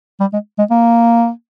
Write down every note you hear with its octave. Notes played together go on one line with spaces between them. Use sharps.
G3
G#3
G#3
A#3